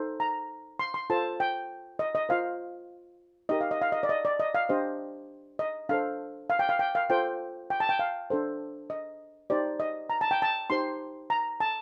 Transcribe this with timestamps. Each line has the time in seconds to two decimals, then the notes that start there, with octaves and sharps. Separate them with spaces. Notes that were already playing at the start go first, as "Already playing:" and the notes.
Already playing: D#4 A4 C5
0.20 A#5
0.79 C6
0.94 C6
1.10 F4 A4 C5 A5
1.40 G5
1.99 D#5
2.15 D#5
2.29 F4 C5 F5
3.49 D#4 G4 A#4 D#5
3.61 F5
3.71 D#5
3.82 F5
3.92 D#5
4.03 D5
4.09 D#5
4.25 D5
4.40 D#5
4.55 F5
4.69 D4 G4 C5 D#5
5.59 D#5
5.89 D4 A4 C5 F5
6.50 F5
6.59 G5
6.69 F5
6.79 G5
6.95 F5
7.10 F4 A4 C5 G5
7.70 G5
7.80 A5
7.89 G5
7.99 F5
8.30 D4 A4 C5
8.90 D#5
9.50 D#4 G4 C5 D5
9.80 D#5
10.10 A#5
10.21 A5
10.31 G5
10.42 A5
10.70 D#4 G4 C5 C6
11.30 A#5
11.60 A5